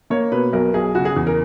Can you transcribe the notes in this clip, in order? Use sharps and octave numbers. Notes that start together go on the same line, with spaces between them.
A#3 C#5
B2 B4
B1 A#4
B1 G#4
C#3 F#4
G#4
E2
A#4